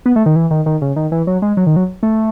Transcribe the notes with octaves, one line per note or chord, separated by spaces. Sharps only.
B3
A3
D#3
E3
D#3
D#3
C#3
D#3
E3
F#3
G#3
F#3
D#3
F#3
A3